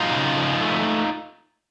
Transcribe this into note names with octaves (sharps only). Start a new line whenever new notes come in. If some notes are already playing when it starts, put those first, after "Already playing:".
Already playing: F#3 D#4 F4
C#3
F3
A3